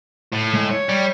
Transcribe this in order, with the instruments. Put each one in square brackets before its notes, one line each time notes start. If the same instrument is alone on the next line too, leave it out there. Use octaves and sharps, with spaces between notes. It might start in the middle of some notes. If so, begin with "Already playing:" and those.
[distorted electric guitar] A2
[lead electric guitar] G#3
C#5
[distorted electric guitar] G3